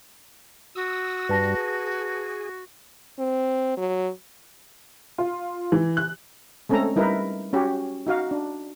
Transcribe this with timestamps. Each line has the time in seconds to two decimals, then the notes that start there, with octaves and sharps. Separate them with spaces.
0.75 F#4 D#6 E6
1.29 G2 G3 B4 A5 A#6
1.57 G#4
3.19 C4
3.77 F#3
5.18 F4
5.72 E3
5.97 F#6
6.69 G#3 A3 C4 C#4 A4 A#5
6.96 G3 D#4 E4 A#4 B4
7.53 C#4 F#4 G4
8.07 D#4 F#4 F5
8.31 D4